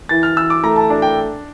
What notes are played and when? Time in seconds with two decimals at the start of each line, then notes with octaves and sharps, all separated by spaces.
0.09 E3 A6
0.23 F6
0.36 E3 E6
0.50 D6
0.63 A3 A#5
0.76 A5
0.90 D4
1.02 G5